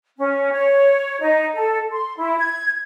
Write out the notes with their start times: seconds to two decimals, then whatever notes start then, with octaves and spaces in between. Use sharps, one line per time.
0.17 C#4
0.53 C#5
1.21 D#4
1.55 A4
1.92 C6
2.17 E4
2.38 G#6